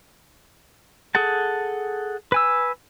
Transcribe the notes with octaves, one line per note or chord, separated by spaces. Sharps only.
G#4 A4 F#5 A5
B4 G#5 E6